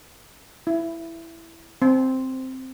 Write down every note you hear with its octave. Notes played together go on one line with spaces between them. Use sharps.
E4
C4